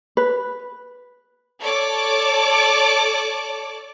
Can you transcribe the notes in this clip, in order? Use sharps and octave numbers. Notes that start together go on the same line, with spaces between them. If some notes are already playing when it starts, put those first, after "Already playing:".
B4
A4 C#5 D5 A5 D6